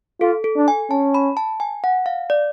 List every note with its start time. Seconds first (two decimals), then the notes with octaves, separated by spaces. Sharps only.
0.21 F4 A4
0.44 A4
0.56 D4
0.68 G#5
0.90 C#4 A5
1.14 B5
1.37 A5
1.60 G#5
1.84 F#5
2.06 F5
2.30 D5